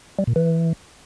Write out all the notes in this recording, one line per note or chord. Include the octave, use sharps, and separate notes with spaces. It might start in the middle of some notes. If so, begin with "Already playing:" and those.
G3
A#2
E3